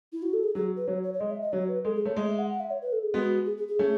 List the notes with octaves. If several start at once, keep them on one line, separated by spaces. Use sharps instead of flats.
E4
F#4
A4
G#4
F#3 G#4
B4
F#3 C#5
C#5
C#5
G#3 D#5
E5
D#5
F#3 C#5
B4
G#3 A4
G#4
A3 C#5
G#3 D#5
E5
F#5
F#5
E5
C#5
B4
A4
G#4
G#3 B3 F#4
G#4
G#4
G#4
A3 C#4